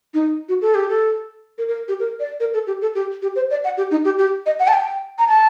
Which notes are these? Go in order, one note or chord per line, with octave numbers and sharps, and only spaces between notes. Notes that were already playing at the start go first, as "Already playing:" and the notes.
D#4
F#4
A4
G4
A4
A#4
A#4
G4
A#4
D5
A#4
A4
G4
A4
G4
G4
C5
D5
F#5
G4
D#4
G4
G4
D#5
F#5
A5
G5
A#5
A5